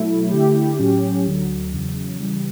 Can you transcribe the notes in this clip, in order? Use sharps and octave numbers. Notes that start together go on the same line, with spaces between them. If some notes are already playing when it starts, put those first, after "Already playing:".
Already playing: B2 F#3 A3 E4
D3 A3 E4 G4
A2 F#3 C#4 G4
D2 D3 F#3
E2 C#3 F#3
C#3 E3 G3